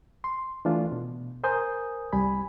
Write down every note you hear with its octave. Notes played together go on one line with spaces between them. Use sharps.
C6
E3 A3 D4 F4
B2
A#4 C5 G#5 D#6 G6
C2 G3 G#5 B5